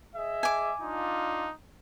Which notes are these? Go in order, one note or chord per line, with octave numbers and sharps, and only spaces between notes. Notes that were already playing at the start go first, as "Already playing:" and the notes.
G#4 D#5 E5
G#5 D6
D4 D#4 F4